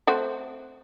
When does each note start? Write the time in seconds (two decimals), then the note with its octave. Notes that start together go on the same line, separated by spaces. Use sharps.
0.07 A3 C4 F#4